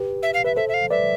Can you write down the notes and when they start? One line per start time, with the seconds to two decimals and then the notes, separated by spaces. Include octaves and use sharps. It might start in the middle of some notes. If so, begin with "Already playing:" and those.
Already playing: G4 B4
0.23 E5
0.34 F5
0.45 B4 E5
0.56 A4 C5 E5
0.69 E5
0.74 F5
0.91 B4 D5 E5